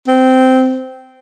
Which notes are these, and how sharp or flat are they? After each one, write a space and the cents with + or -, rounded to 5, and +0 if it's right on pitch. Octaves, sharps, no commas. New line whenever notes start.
C4 -15